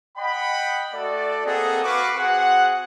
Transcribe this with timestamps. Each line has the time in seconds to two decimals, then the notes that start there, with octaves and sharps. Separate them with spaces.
0.17 D#5 F#5 G5 B5
0.94 A3 F#4 A4 D5
1.45 A#3 C4 G#4 A4 D#5 F#5
1.84 F#4 B4 F5 C#6 D6
2.16 C4 F#4 G#4 F#5